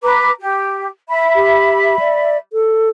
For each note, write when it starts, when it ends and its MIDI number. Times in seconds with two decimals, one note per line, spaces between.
0.02 0.29 71
0.02 0.29 82
0.02 0.29 86
0.40 0.86 67
1.08 2.35 76
1.08 2.35 83
1.36 1.99 67
1.99 2.37 74
2.53 2.90 69